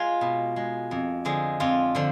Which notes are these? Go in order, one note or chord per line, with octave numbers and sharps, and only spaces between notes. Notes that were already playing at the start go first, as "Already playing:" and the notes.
Already playing: G#3 F4
B2
G#3
F2
D3 F3 G#3
F2 F4
D3 F3